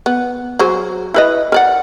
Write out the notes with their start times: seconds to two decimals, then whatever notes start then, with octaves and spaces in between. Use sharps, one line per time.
0.06 B3
0.59 F#3 G#4 C5
1.14 E4 B4 D#5
1.52 A#4 D5 F#5